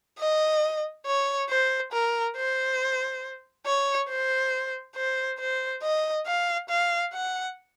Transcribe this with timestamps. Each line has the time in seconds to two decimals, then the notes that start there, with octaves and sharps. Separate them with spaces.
0.19 D#5
1.06 C#5
1.50 C5
1.92 A#4
2.36 C5
3.66 C#5
4.09 C5
4.96 C5
5.39 C5
5.82 D#5
6.26 F5
6.69 F5
7.13 F#5